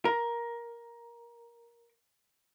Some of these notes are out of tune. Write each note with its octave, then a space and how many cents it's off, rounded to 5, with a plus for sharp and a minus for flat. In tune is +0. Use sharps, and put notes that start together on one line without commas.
A#4 +15